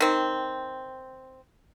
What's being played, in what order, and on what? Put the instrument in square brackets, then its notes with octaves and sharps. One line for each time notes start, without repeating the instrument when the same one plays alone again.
[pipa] D#3 C4